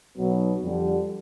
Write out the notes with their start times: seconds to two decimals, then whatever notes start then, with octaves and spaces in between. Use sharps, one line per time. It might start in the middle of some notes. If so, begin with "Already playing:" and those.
0.18 B1 B2 F#3 B3
0.61 F2 D3 G3